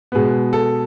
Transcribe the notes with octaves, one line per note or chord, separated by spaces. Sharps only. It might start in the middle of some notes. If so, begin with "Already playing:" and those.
B2 G#3 B3
A4